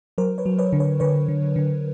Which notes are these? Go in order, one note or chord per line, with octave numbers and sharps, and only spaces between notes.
F#3 A#4 C5
B4 C#5
F#3
B4 C#5
D3
B4 C#5
D3 B4 C#5
D3
D3